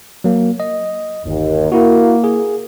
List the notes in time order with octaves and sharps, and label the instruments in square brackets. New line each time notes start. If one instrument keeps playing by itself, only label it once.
[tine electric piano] F#3 A#3
D#5
[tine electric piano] G1 [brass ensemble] D#2
[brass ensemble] A#3 [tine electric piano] E4 F#4
[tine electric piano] G#4